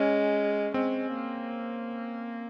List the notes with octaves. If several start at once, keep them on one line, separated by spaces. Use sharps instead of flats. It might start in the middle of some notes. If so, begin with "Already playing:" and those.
Already playing: G#3 C#4
G#3 C4
A#3